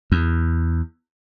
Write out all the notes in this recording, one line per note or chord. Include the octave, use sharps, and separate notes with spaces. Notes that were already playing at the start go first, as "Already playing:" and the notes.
E2